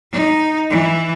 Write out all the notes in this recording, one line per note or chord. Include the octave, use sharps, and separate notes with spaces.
D#4
E3